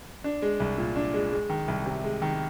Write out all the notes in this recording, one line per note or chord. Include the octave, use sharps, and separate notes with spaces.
D4
G#3
C2
A#2
D4
G#3
G#3
D#3
C2
C3
G#3
D#3